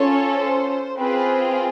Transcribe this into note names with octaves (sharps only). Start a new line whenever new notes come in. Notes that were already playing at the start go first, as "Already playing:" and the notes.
Already playing: C#4 F4 A4 C#5
C5
C4 F4 G#4 B4